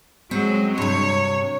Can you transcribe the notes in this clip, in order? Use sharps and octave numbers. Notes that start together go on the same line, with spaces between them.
F#3 G#3 C4
G2 C3 C#5